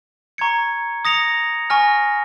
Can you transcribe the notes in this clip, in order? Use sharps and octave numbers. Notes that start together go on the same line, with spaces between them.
A#5 C#6 G#6 C#7
D#6 A#6 C#7 F7
G#5 C#6 F6 A#6